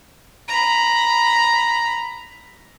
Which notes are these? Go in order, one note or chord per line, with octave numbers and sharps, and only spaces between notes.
A#5 B5